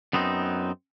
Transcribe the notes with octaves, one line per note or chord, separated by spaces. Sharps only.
F#2 B3 C4 D#4